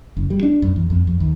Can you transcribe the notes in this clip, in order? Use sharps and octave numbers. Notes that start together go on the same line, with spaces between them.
F#1
G3
D4
F#2
E2
F2
F2
D#2